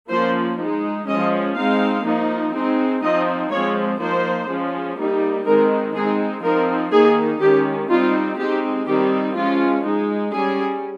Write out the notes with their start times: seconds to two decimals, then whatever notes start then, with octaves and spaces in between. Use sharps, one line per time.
0.10 F3 A#3 C#4 C5
0.58 G#3 D#4
1.07 F3 G#3 C#4 D#5
1.56 G#3 C4 D#4 F5
2.05 F3 A#3 D#4
2.54 G#3 C4 D#4
3.02 F3 C4 D#4 D#5
3.51 F3 G#3 C4 C#5
4.00 F3 A#3 D#4 C5
4.48 F3 G#3 C#4
4.98 G3 A#3 D#4
5.46 D#3 G#3 C4 D#4 A#4
5.95 G#3 C4 D#4 G#4
6.43 F3 C4 D#4 A#4
6.92 D#3 A#3 D#4 G#4
7.41 D#3 G#3 C#4 G4
7.90 G3 C4 D#4 F4
8.38 G#3 C4 D#4 G4
8.87 D#3 G3 C4 D#4 G4
9.36 F3 G#3 C#4 F4
9.85 G#3 D#4
10.33 G3 C#4 G#4